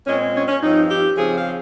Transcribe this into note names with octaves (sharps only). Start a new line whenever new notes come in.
A#2 G#3 C4 C#4
C#4
C#4
G2 F3 C4 D#4
G4
C#3 F3 C4 G#4
F5